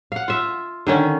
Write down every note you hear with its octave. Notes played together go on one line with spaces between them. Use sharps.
F5 F#5
F4 E5
D3 D#3 C#4